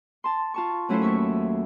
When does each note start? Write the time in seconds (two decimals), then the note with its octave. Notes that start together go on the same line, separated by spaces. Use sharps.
0.24 A5 C6
0.54 F4 A5 C#6
0.89 F#3 A3 C#4 E4 A4 C5
1.02 D#2 E5 C#6